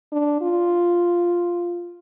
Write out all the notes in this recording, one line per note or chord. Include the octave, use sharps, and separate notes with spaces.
D4
F4